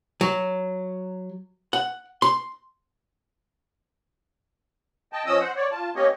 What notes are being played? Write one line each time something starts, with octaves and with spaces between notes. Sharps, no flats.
F#3
F#5
C6
D#5 G5 A5
F3 C#4 D#5 D#6 E6
C5 F#5
C#5 D5
F4 A5
A#3 B3 C#4 G4 C#5 D#5